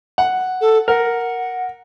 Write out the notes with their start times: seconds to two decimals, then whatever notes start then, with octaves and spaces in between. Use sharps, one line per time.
0.18 F#5
0.61 A4
0.88 A#4 F#5